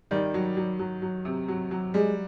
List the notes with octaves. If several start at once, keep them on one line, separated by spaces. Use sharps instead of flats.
D#3 G3
F#3
F#3
F#3
F#3
C3
F#3
F#3
G3 G#3